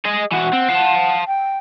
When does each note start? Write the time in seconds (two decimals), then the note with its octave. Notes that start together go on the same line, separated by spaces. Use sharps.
0.05 G#4 D#5
0.32 E3 F#4 F#5
0.53 C4
0.69 F5 A5
1.27 G5